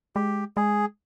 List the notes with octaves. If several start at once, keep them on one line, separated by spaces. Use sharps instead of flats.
G#3 G4
G#3 G#4